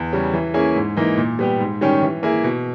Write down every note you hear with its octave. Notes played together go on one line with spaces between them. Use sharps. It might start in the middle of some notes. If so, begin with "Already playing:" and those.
Already playing: E2
C#3 G3
E3
A#3 C#4 E4 G#4
G#2
E3 A#3 D#4
A#2
G3 B3 G4
G#2
D#3 G3 C#4 G4
E3
A#3 E4 G#4
B2